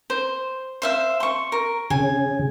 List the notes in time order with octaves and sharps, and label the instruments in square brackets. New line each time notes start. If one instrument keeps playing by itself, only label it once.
[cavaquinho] C5
C5 E5 F5
C6 C#6
A#4
[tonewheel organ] C#3 [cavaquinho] G#5